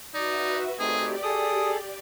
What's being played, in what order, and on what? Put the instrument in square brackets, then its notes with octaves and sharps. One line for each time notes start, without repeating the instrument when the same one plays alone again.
[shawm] D#4 [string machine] F#4 B4 E5 [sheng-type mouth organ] D5
[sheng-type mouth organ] A3 C4 D#4 [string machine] G4 D5 [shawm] G#4
[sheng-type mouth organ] G#4 A4 [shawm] D#6